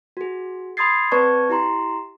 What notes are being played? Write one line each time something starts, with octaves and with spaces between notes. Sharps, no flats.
F#4 G#4
B5 C6 D#6 G#6 A6 C7
C4 B4 D5 A5 C#6 G#6
E4 G4 A#5 C6